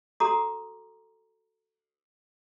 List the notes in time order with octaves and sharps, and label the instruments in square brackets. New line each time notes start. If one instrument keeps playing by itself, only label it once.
[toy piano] F#4 A4 A#5 C6 D6 D#6